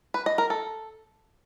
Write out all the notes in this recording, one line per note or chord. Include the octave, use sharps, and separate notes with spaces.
B4
D#5
A#4
A4